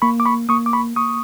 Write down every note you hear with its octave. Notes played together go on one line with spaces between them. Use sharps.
A#3 B5 C#6
D6
B5 C#6
A#3 C#6 D#6
D6
B5 C#6
A#3 C#6 D#6